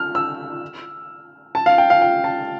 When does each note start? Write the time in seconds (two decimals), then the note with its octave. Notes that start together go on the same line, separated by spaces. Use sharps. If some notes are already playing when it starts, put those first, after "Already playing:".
Already playing: F6
0.15 E6
1.55 A5
1.66 F5
1.78 G5
1.90 F5
2.02 G5
2.24 A5